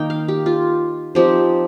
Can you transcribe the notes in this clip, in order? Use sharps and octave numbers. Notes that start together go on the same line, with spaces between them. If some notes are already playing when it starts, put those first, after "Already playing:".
Already playing: D#3 A#3 D#4 G5 A#5
F5
G4
F4
F3 C4 D#4 G4